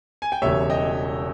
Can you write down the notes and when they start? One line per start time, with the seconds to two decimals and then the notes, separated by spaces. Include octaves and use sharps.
0.22 G#5
0.32 G5
0.42 E1 E2 C#3 E3 G3 C#5 E5
0.70 D#5 G5